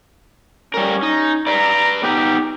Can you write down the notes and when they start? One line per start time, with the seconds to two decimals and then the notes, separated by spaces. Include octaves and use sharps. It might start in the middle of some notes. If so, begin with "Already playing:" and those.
0.74 G3 C#4 A#4
1.03 D#4
1.47 B4 D5 A#5
2.03 B3 D#4 G4 B4